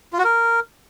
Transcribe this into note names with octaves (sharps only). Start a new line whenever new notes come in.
F4
F#4
A#4